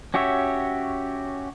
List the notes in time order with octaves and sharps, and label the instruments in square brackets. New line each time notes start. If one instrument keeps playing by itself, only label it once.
[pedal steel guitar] C#4 F#4 G4 C#5 E5